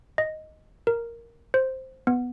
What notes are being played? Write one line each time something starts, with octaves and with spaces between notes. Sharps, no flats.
D#5
A#4
C5
B3